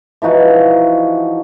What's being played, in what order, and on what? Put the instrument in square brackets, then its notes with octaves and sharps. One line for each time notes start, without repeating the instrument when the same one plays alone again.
[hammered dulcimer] E3 F3 D#4 F#4